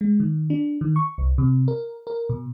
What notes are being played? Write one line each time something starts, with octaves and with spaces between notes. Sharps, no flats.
G#3
D#3
D4
D#3
C#6
C2
C3
A#4
A#4
B2